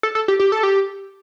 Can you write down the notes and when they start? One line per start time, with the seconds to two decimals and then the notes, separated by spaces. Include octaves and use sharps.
0.03 A4
0.15 A4
0.28 G4
0.39 G4
0.52 A4
0.63 G4